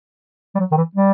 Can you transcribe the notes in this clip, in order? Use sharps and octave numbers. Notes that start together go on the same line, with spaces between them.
G3
F#3
D#3
E3
G3